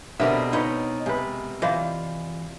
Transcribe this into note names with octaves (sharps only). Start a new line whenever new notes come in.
B2 D3 B3 C4 G4 A#4 E5
D#4 B4 C#5 D#5 C6
C3 G#3 B4
E3 F4 C5 D5 D#5